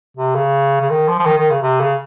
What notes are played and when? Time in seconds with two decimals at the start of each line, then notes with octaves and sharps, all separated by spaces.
0.17 C3
0.35 C#3
0.81 C#3
0.90 D#3
1.08 F3
1.19 F3
1.26 D#3
1.38 D#3
1.51 C#3
1.62 C3
1.81 C#3